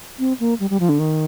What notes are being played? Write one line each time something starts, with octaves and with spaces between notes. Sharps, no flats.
C4
A#3
G3
G3
F3
D3
D#3